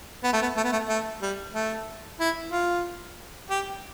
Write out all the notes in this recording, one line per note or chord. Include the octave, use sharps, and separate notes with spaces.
B3
A3
B3
A3
B3
A3
A3
G3
A3
E4
F4
G4